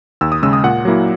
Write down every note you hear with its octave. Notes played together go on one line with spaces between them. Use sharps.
D#2 E6
D#6
C#3 G#3 E6
D#6
A#2 F#5
F#3 A#3 E4